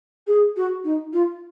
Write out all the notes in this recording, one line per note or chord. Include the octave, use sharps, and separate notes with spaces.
G#4
F#4
D#4
F4